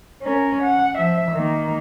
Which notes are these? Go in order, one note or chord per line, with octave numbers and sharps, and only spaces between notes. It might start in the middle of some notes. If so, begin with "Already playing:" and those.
C#4 A#4
F#5
F3 E5
D#3 A#3